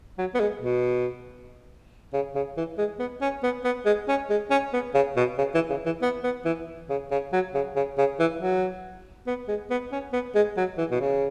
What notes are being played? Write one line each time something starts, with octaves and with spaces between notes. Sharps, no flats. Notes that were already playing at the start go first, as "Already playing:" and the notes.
F#3
B3
G#3
B2
C#3
C#3
E3
G#3
B3
C#4
B3
B3
G#3
C#4
G#3
C#4
B3
C#3
B2
C#3
E3
C#3
E3
B3
B3
E3
C#3
C#3
F#3
C#3
C#3
C#3
E3
F#3
B3
G#3
B3
C#4
B3
G#3
F#3
E3
B2
C#3